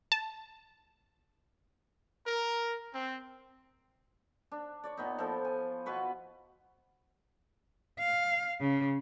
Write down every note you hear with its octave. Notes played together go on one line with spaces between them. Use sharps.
A5
A#4
C4
D4
C#5 D5
A#2 B3 D#4
F3 E4 A4
G#5
B2 F#4 B4 C#6
F5
C#3